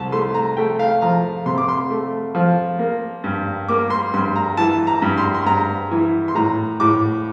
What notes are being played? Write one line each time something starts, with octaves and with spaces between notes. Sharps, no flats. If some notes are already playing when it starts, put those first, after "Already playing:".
Already playing: C2 A5
A3 C6
A#5
A3 G5
F5
F3 A#5
C3 C6
D6
C6
A3
F3
A#3
G2
A#3 D6
C6
G2 C6
A#5
E3 A5
A#5
G2
C6
C6
G2 A#5
E3
C6
A2 A#5
A2 D6